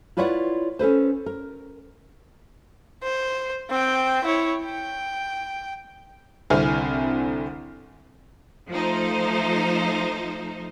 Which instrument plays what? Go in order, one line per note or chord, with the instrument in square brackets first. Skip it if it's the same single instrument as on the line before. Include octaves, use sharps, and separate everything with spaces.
[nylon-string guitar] E4 F4 B4 C#5 D5 F#5
C#4 A4 B4 C5
A#4
[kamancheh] C5
C4 G5
E4 C#5
G5
[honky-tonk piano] C2 D3 C4 E4 G#5 F6
[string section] F3 A3 D#4 C5